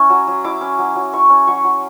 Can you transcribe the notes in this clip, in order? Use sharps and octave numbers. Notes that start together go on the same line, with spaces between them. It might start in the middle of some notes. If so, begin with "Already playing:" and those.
Already playing: C#4 E4 C#6
F#3
F#3
E4 D6
C#4
F#3
F#3
E4 C#6
C#4
F#3 C#6
F#3